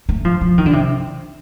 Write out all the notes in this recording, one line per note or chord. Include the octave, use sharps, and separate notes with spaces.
A3
F3
F3
D#3
D3
C3